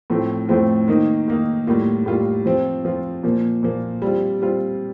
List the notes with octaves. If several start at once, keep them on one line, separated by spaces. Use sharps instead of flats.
A2 F3 A3 C4 F4
A2 F3 A3 C4 F4
D#3 A#3 D#4
D#3 A#3 D#4
A2 G3 A#3 F4
A2 G3 A#3 F4
F3 C4 F4
F3 C4 F4
A#2 F3 A#3
A#2 F3 A#3
G3 C4 F4
G3 C4 F4